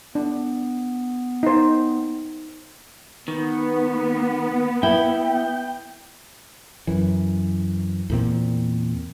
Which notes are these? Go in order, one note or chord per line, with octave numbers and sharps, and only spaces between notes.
B3 D4
D#4 C5
D#3 B3
E4 G5
F#2 E3
E2 A#2 C4